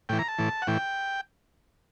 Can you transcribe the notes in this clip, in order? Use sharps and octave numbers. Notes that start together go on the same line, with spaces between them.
A2 E3 G5
A#5
A5
A2 E3
F#5
A2 E3 G5